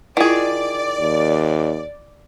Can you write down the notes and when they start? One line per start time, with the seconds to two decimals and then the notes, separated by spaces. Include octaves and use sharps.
0.17 D#3 E4 F4 G#4 D5
0.99 D#2